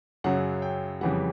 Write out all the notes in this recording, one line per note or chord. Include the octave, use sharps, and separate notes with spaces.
F#2 C#3 F#3 F#5
G5
F2 C#3 E3 G3 F#5